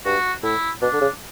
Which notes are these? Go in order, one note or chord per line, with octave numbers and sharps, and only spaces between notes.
G2 F#4
A2 E4
B2 D4
D3
C#3